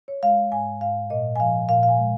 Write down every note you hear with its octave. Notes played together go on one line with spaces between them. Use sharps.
C#5
G#3 F5
F5
G#2 G#5
G#2 F5
A#2 D#5
G#5
F3 F5
A#2 F5
F5
G#5
G#3